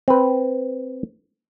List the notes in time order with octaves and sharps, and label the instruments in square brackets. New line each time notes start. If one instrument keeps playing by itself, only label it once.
[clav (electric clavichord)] C4 B4